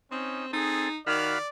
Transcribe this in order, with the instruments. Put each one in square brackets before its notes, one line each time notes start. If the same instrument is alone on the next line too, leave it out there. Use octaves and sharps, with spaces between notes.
[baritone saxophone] C4 [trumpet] C#4 [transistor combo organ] D#4
[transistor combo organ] C4 A4 [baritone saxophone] D#4 [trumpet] G#4
[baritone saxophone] D#3 [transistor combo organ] F#4 F5 B5 [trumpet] D5